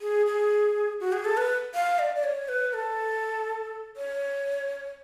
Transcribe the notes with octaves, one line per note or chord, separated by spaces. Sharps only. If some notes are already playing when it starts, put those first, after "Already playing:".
G#4
G#4
F#4
G#4
A4
B4
F5
D5
D5
C#5
B4
A4
C#5